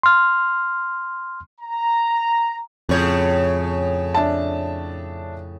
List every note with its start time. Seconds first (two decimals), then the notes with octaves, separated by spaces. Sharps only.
0.03 C6 F6
1.61 A#5
2.89 F2 A2 C#3 C#5
4.14 D4 E5 A5